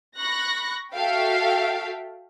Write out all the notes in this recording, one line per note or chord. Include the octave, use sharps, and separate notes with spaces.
B5 C#6 F#6 A#6
F#4 A4 E5 F5 G5